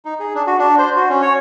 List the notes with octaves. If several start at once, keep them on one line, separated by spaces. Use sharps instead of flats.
D#4
G#4
D4
F#4
D4
C5
F#4
C#4
C#5